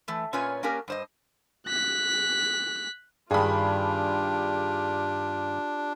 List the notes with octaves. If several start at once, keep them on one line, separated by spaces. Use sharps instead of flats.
E3 A3
A#2 C#4 F4 B4 C#5 G#5
A#3 C#4 D4 G4 A#4 G#5
G2 C5 D#5
F#6 B6
G2 D#3 D4 F4 G4 G#4 B5